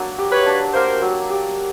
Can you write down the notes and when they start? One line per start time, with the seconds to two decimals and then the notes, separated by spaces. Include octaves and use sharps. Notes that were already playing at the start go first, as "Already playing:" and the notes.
Already playing: F#3 A#3 D4
0.18 G4
0.32 B4 C#5
0.46 D4
0.74 A#3 A#4 C5
1.02 F#3
1.30 G4